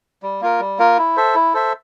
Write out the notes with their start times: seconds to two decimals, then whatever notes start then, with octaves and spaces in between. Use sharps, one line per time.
0.23 G3
0.41 A#3 F4 A#4
0.60 G3
0.79 A#3 F4 A#4
0.98 E4
1.17 A4 C5 E5
1.35 E4
1.54 A4 C5 E5